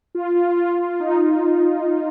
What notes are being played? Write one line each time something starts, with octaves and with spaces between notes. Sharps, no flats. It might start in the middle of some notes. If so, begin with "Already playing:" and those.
F4
F4
F4
F4
D#4